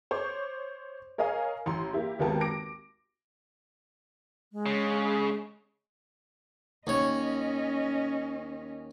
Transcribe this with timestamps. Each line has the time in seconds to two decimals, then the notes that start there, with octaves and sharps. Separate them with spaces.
0.11 C5 C#5 C#6 D6
1.18 A#4 C#5 D#5 F5 G#5
1.66 A1 A#5 C6
1.93 A#3 E4 G4
2.19 G#1 D#2 B3 A#4 G5 A5
2.41 D6 A#6 D7
4.52 G#3
4.66 C#3
6.87 D#2 C#4 C#5 D#5